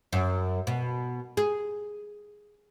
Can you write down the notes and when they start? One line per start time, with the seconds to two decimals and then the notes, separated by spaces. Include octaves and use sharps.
0.13 F#2
0.67 B2
1.37 G#4